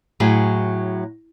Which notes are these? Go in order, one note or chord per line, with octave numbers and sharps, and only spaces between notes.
A2 F#3 G#4